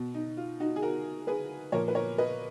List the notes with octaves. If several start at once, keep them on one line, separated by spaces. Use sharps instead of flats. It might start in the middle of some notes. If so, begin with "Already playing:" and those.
Already playing: B2
D#4
F4
D#4 F#4
G#4
F#4 A#4
G#4 B4
A#2 F3 A#4 C#5
B4
A#4 C#5
B4 D#5